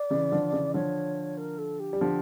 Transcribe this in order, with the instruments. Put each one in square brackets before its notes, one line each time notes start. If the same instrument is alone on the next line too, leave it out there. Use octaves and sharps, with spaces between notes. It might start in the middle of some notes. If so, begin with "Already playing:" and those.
Already playing: [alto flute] D5
[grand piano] C#3 E3
D3 F3
C#3 E3
[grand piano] D3 F3 [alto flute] C#5
[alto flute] A#4
A4
G4
[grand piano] G3
D3 F3